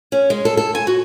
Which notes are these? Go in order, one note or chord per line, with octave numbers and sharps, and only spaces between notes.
C#4
G#3
A4
A4
G#5
F#4